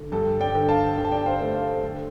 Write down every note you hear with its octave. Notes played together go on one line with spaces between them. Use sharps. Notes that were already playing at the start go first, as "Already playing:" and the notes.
Already playing: D3
G2 A4
D5 G5
D3
F5 A5
D3 G5
A5
D5 G5
C5 F5
A3
C5 F5
D3 A4